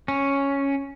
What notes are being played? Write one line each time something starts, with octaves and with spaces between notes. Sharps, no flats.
C#4